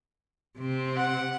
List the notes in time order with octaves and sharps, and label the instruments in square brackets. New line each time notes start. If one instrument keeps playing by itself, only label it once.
[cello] C3 C4
[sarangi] F#5